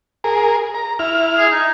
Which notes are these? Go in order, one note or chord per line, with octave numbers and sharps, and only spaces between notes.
G#4 A#4
A#5
E4 F6
G#4
D#4